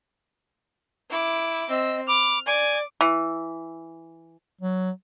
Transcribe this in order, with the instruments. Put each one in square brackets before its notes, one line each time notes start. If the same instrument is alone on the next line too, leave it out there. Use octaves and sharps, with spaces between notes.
[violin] E4 D6
[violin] C4 [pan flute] D#5 [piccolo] E6
[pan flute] B5 [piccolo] D6 [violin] F6
[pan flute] D5 [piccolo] G#5 [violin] D6
[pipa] E3
[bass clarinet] F#3